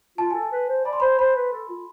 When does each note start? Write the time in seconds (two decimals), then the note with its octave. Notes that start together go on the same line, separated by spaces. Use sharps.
0.18 F4 A5
0.30 A4 G#5
0.42 A5
0.52 B4
0.69 C5
0.85 D5 B5
0.93 C6
1.00 C5 B5
1.19 C5 B5
1.36 B4
1.52 A4
1.69 F4